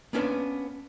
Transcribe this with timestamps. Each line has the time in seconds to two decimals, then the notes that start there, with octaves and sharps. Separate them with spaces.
0.13 A#3 B3 C#4 D4 G4 B4